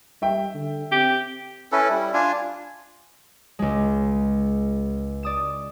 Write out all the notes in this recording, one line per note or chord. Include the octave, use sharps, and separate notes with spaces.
G3 E5 G5
D3
C4 G4
C#4 E4 A4 B4
G3 E4
D4 F4 G#5
C#2 G#3
D5 D#6 E7